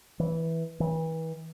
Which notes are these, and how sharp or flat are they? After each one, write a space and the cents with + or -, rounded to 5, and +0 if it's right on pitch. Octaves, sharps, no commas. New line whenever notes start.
E3 -10
E3 -35